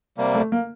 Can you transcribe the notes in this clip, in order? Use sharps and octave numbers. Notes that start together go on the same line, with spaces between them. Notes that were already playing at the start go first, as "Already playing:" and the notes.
C3 G3 A#3
A3
A#3